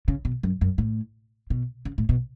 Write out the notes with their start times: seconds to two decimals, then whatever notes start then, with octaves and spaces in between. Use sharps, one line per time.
0.08 C#3
0.25 B2
0.43 F#2
0.61 F#2
0.78 A2
1.50 B2
1.85 C#3
1.98 A2
2.09 B2